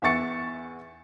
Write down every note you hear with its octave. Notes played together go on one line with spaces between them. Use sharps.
E2 E5 F#5 C#6 A6 C#7